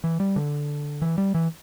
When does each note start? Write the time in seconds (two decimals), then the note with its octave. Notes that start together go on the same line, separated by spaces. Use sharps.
0.04 E3
0.20 G3
0.36 D3
1.02 E3
1.18 G3
1.34 E3